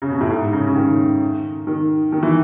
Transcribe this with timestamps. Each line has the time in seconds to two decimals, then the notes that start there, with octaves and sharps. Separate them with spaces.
0.02 C#3
0.11 B2
0.21 A2
0.30 G#2
0.53 C#3
0.67 C#3
0.76 D#3
1.67 D#3
2.12 D#3
2.23 E3